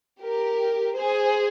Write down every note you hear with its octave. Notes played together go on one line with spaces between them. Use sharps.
G4 A#4
G#4 C5